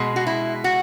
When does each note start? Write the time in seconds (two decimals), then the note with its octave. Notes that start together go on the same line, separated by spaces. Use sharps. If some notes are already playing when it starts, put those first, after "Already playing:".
Already playing: B2 G#3
0.16 F#4
0.27 E4
0.64 F#4